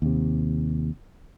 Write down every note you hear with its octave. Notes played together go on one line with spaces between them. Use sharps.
D#2 C3